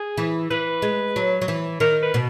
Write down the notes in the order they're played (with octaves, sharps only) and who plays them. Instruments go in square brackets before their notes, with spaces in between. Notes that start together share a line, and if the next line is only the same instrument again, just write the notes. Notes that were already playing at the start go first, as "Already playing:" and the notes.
Already playing: [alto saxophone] G#4
[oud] E3
[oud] E3 [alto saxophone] B4
[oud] G#3
F#3
F#3
E3
[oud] D#3 [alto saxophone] A#4
[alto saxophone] B4
[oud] B2